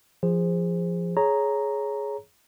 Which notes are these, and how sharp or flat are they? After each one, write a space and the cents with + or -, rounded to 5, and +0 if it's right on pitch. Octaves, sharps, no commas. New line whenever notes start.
F3 -15 G#4 -20 C5 +0
G#4 +10 C#5 +0 A#5 +0